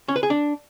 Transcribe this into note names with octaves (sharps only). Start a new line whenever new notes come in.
C#4
B4
G#4
D4